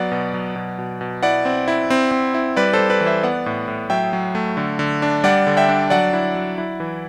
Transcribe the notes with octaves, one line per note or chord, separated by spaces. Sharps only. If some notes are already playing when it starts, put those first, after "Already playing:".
Already playing: F#3 B3 D5 F#5
B2
F#3
B2
B2
B2
E4 D5 F#5
C4
E4
C4
C4
E4
G3 B4 D5
A4 C5
G3
B4 D5
E3
C5 E5
B3 D5 F#5
A2
A2
F#3 E5 G5
F#3
A3
D3
D3
D4
G3 D5 F#5
D3
E5 G5
D4
F#3 D5 F#5
E4
F#3
E4
E3